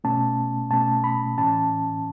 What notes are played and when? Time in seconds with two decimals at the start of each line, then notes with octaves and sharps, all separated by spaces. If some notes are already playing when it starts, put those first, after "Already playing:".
0.04 B2 A3 C#4 A5
0.71 B2 A3 C#4 A5
1.04 B5
1.38 A2 E3 C#4 A5